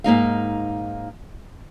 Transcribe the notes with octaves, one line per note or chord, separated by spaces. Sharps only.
G#2 A#3 D#4 F5